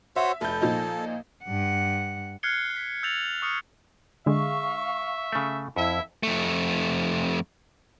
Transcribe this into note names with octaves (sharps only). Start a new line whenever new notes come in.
F#4 C5 C#5 E5
F1 A4 G6
A#2 F3 D#4
G2 F#5
F6 F#6 G#6 C7 C#7 G7
B6
E6 G6 A6 F7 F#7
C#6 D#6 F6 C#7
D3 G#3 E5 F5 C#6
C#3 A3
F2 E4 E5
F2 A3